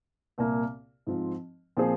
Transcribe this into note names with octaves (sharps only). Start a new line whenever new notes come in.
C2 A#2 A#3
G#2 F3 C4 F4
A#2 F3 C4 G#4 C5